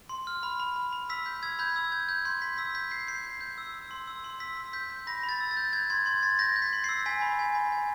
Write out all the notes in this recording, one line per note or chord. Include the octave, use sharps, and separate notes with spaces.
C6
F6
B5
B5
B5
B5
E6 B6
G6
E6 G#6
B5 G6
E6
G6 G#6
G6
C6 G6
C6 B6
E6 B6
G6 B6
G6 C7
G6 C7
G6
G6
E6
E6
C6
E6
C6
E6 B6
E6
G6 B6
G6
B5 A#6
B5
A6
E6
A6
G6
G6 G#6
C6 G#6
C6 G#6
C6 A6
G6 A#6
G6
B6
C6
C7
E6
G#5 B6
B5
G#5
B5
G#5